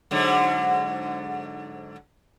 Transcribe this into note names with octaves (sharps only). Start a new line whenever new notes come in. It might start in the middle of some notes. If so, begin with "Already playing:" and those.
G#2 D3 F#3